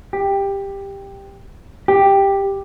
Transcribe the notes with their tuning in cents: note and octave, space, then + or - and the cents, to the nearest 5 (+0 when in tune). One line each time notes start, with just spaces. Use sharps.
G4 +10
G4 +5